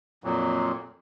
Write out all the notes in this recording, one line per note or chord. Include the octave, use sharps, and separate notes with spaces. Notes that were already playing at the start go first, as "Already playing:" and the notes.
F2 A#2 F#3